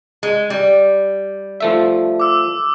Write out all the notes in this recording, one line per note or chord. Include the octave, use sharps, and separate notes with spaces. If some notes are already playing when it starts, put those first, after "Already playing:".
G#3
G3
F3 A3 E5
D6 E6